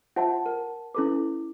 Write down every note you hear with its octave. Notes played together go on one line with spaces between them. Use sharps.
F4 C5 E5 F#5 A5
A#4
C#4 E4 A4 B4 D6